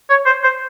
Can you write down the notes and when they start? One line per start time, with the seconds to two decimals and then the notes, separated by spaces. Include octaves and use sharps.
0.10 C#5
0.26 C5
0.44 C5